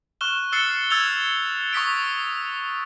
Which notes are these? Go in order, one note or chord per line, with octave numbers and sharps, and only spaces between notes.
C#6 F6 F#6 E7 G7
E6 F#6 A6 C7 C#7 G7
E6 F#6 G#6 A6 F7 G7
C#6 D#6 B6 D7